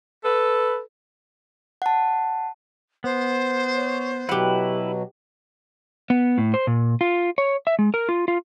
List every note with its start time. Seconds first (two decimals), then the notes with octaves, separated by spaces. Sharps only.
0.24 A4 B4
1.82 F#5 A5
3.04 B3 C5
3.75 C#5
4.29 B2 F#3 E4 G4 B4 F#5
6.10 B3
6.38 A2
6.54 C5
6.67 A#2
7.01 F4
7.38 C#5
7.67 E5
7.79 G#3
7.94 A#4
8.09 F4
8.28 F4